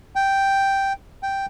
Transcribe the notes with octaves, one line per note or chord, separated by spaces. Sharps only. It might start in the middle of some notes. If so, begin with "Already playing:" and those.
G5
G5